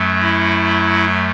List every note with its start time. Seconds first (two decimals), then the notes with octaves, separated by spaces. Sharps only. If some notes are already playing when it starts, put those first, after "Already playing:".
Already playing: F#2 F#3 A3
0.21 E4